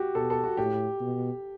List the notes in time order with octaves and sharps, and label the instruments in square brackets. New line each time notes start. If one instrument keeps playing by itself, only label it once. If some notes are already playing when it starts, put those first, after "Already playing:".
Already playing: [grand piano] F#4 G4
[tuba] B2 [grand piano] A4
[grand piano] A4
F#4
[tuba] A2 [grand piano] G4
[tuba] B2